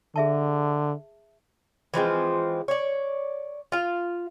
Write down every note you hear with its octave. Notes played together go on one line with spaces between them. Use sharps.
D3 G#4 E5 A5
E3 F3 G#3 C4
C#5 D5
F4 F5